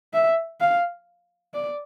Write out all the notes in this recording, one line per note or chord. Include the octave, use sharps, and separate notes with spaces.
E5
F5
D5